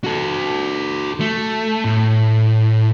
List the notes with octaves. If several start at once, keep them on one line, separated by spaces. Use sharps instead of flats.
F#4 A4
A3
A2